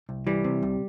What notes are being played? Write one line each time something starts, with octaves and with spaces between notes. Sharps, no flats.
C2
E3 G3
C3
C2